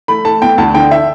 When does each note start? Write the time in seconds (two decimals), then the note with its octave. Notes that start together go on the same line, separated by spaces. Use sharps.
0.08 A3 B5
0.25 A3 A5
0.42 B3 G5
0.58 D2 A5
0.74 D3 G5
0.91 E5